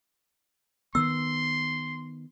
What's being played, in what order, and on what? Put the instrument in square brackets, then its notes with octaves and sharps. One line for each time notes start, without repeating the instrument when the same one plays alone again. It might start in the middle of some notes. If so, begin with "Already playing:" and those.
[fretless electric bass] D#3 B3 [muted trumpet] C6 [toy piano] E6